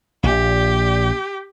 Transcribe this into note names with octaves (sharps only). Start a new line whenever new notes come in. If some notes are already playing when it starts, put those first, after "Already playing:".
A#1 A#2 G4